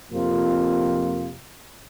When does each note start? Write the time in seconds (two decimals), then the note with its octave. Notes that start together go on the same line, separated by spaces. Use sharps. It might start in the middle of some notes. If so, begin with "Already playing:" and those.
0.10 F2 C3 F3 A#3 F4